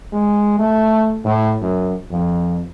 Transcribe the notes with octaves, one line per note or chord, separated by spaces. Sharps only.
G#3
A3
A2
F#2
F2